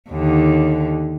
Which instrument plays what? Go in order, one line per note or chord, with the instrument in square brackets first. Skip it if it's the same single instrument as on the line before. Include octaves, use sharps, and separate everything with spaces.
[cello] D#2 D3